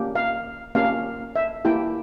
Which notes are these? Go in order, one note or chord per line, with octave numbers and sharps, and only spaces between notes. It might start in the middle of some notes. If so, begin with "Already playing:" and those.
Already playing: A#3 C#4 G4
F5
A#3 C#4 G4 F5
E5
A#3 E4 G4 G5